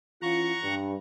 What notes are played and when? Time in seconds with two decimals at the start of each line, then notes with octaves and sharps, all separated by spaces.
0.22 E3 C#4 F4 F#5 A#5 C#6
0.63 G2